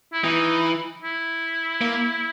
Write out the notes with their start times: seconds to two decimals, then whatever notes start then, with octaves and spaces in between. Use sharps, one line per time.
0.13 E4
0.24 E3 D#4
1.02 E4
1.81 A#3